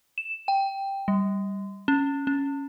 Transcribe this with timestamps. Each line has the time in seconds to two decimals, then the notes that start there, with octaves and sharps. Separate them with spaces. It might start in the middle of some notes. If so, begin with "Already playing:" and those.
0.18 E7
0.48 G5
1.08 G3
1.88 C#4
2.27 C#4